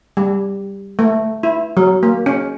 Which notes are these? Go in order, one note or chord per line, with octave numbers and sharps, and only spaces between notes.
G3
A3
E4
F#3
A#3
C#4